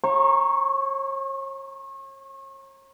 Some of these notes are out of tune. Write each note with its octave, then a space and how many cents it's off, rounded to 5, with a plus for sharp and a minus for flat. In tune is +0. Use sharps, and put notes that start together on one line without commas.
C#5 -40 A#5 +0 C#6 +0